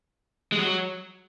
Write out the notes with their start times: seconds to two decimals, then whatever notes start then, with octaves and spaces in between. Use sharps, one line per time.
0.52 G#3
0.58 F#3